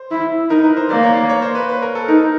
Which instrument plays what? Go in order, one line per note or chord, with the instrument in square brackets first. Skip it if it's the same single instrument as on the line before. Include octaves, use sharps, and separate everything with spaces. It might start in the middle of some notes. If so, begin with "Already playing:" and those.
Already playing: [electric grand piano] C5
[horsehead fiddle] E4
[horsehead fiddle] D#4 [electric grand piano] A#4
[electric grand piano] B4
C5
[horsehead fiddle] A#3 [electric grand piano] D5
[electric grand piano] C#5
D5
C#5
C5
B4
B4
A#4
A4
[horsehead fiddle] D#4 [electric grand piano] A#4